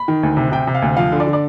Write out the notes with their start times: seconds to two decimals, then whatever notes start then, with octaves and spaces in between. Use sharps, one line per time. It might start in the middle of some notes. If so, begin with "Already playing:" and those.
Already playing: B5
0.08 D#3
0.23 D2
0.37 C3
0.52 C3 G5
0.67 C3
0.75 F5
0.82 D2
0.97 F3 F5
1.12 D3
1.20 D5
1.27 D3
1.33 D5